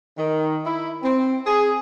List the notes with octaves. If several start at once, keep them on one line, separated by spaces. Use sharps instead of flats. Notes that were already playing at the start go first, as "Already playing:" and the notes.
D#3
E4
C4
G#4